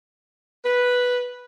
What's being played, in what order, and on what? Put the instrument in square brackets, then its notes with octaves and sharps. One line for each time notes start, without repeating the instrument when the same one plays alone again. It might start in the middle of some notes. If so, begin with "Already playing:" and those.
[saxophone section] B4